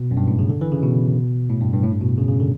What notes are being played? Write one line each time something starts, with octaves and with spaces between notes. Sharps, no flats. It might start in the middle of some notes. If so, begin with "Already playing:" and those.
Already playing: B2
F#2
G2
A2
C#3
D3
E3
C#3
B2
A2
G2
G2
A2
G2
B2
C#3
C#3
D3